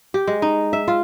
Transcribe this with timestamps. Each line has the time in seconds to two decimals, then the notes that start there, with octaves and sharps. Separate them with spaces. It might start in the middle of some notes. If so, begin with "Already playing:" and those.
0.14 G4
0.27 G#3
0.42 D#4
0.73 E5
0.88 F4